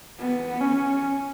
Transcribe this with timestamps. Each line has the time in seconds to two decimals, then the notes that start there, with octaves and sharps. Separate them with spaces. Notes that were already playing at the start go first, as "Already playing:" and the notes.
0.20 B3
0.61 C#4